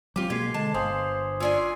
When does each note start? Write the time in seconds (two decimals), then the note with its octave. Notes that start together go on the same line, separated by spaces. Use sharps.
0.16 F#3 A3 C4 F4 G4 D6 G7
0.30 B2 G#3 A#3 G#6 B6 C7
0.54 D3 G#3 A5
0.74 G1 C5 F5 G#5 C6 D#6
1.40 C#4 D4 F4 G#5 E6 C7